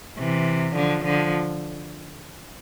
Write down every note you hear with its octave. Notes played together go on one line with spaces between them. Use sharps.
C3 E3
D3 F3
D3 F3